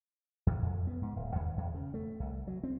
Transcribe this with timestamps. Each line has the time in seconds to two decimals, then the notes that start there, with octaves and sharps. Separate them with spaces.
0.47 E2
0.62 F2
0.87 B3
1.02 G#2
1.16 D1
1.35 D#2
1.57 E2
1.74 C#3
1.94 A3
2.20 C2
2.47 F#3
2.63 C4